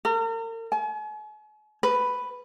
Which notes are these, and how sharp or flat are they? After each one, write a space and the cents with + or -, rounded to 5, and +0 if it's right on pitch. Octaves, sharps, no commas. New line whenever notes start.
A#4 -40
G#5 +45
B4 +5